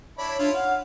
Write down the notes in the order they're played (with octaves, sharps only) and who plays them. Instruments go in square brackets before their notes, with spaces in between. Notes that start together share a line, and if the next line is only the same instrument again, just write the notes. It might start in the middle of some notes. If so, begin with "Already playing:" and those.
[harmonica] D4 E4 B5 [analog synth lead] C#5
[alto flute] D4 [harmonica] E4 F4
[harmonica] F5 [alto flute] F#5